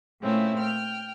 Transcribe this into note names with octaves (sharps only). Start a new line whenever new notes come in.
A#2 A3 C4 C#4 E4
G5 F6